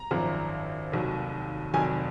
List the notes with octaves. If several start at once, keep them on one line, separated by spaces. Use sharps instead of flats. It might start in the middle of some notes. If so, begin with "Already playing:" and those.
Already playing: A#5
G#1 F#2 F3
F1 D#2 D#3 F#3
F1 F2 D#3 F#3 G#5